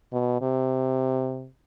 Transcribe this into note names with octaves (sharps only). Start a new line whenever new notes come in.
B2
C3